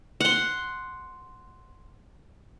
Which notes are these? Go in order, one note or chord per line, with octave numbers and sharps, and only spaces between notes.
F#5 C6